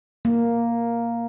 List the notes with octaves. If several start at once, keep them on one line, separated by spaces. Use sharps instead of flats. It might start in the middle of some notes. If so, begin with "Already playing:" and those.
A#3